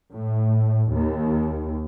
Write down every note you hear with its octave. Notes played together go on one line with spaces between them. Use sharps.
A2
D#2